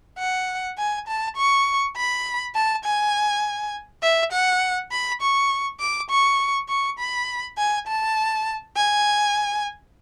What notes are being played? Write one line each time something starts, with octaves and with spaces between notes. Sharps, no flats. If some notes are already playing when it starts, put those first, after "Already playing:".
F#5
G#5
A5
C#6
B5
A5
G#5
E5
F#5
B5
C#6
D6
C#6
C#6
B5
G#5
A5
G#5